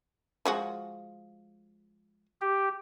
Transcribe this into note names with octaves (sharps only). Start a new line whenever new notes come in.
F3 G#3 F#4
G4